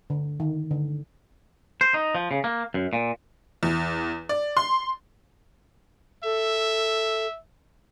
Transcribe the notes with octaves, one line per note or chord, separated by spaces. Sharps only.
D3
D#3
D3
C5
D#4
F3
C#3
A#3
F#2
A#2
E2
D5
C6
A4 E5